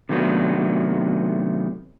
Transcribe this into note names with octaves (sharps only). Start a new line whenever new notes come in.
C3 D#3 F#3 A3 B3 D4